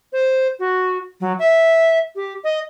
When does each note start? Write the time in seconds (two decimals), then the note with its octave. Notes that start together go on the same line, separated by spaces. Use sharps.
0.13 C5
0.60 F#4
1.21 F#3
1.39 E5
2.16 G4
2.44 D#5